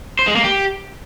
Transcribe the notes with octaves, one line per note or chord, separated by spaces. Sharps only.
C5
G#3
A#3
G4